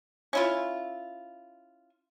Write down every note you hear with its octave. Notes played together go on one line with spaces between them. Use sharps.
C#4 E4 F4